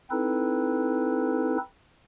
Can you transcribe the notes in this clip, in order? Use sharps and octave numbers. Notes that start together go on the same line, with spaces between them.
C4 D#4 E4 A4 B4